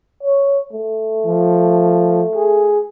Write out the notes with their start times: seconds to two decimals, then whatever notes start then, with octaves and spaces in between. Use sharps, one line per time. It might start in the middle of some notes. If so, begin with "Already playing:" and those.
0.23 C#5
0.73 A3
1.26 F3
2.35 G#4